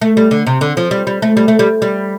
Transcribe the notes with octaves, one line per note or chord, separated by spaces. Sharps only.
A3
G3
D3
C3
D3
F3
G3
G3
A3
G3
A3
G3
G3